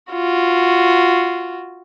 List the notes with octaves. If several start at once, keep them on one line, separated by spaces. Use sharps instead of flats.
F4 F#4